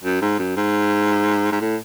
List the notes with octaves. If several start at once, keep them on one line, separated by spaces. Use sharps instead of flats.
F#2
G#2
F#2
G#2
G#2
A2